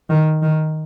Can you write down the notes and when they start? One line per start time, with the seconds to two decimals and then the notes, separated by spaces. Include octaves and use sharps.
0.10 D#3
0.42 D#3